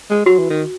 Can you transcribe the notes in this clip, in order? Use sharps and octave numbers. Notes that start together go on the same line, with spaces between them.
G#3
F#3 F#4
E3
D#3